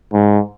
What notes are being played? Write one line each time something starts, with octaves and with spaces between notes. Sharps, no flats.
G#2